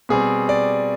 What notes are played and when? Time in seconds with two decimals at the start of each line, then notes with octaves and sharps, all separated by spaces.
0.09 B2 G3 C4 G#4
0.49 D5